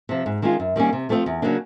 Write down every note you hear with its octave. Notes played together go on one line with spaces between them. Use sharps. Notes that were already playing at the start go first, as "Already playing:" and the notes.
C3 F3
G#2
D#3 G#3 C#4 F4
F#2
D#3 G3 A#3 C#4
C3
F3 A3 C4 F4
E2
C#3 F#3 A#3 D4